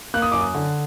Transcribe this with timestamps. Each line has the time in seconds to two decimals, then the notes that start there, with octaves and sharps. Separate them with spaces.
0.14 A#3 F#6
0.22 D#6
0.32 F#2 D6
0.41 D#6
0.55 D3